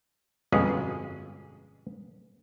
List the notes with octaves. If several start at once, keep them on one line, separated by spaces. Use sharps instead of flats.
G1 F2 B2 G#3 C#4 G#4